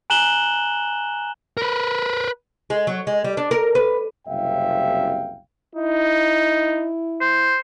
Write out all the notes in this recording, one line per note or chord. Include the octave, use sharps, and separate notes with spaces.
G#5 A#5 F#6 E7 F#7 G7
A#4 B4
G#3
F#3
G#3
G3
D4
A#4
B4
F#1 C2 C3 E5 F5 G5
D#4 E4
C5